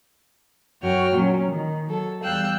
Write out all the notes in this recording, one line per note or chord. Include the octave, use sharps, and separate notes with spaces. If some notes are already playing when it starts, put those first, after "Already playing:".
F#2 F#4 C#5 G5 F6
A#2 F#3 C#4
D#3
F#3 A4
E2 G3 F5 G5 E6 F#6